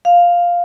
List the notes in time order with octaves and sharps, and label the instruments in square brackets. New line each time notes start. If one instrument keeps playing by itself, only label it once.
[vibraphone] F5